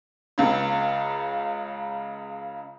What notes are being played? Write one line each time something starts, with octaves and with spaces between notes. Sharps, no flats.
C#2 C#3